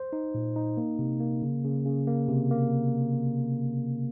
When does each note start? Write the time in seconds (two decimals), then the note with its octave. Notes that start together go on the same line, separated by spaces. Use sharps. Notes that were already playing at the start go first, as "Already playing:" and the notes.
Already playing: C5
0.13 D#4
0.35 A#2
0.56 D#4
0.77 A#3
0.99 C3
1.20 A#3
1.42 C#3
1.65 C#3
1.86 C#3
2.07 A#3
2.28 C3
2.51 A#3